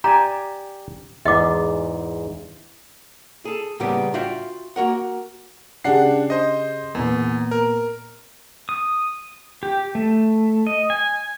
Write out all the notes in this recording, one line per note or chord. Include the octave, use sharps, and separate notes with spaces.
G4 D5 G#5 A#5
E2 G#2 D#5 D6
G#4 A4
A2 C#3 G3 A#3 B3 G4
F4 F#4 E5 F5 G5
A#3 F#4 A#4 F#5
C#3 D4 G4 G#4 F#5 C7
C5 D#5
E2 A#2 B3 B4
A#4
D#6
G4
A3
D#5
G#5